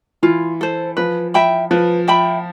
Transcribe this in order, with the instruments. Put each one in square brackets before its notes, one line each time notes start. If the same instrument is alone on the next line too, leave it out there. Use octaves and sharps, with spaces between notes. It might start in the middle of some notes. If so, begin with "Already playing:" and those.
[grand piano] E3 [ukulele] F4
[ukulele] A4 C5
[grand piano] F3 [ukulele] B4
[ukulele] E5 G5 B5
[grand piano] F3 [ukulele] B4
[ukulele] E5 G5 B5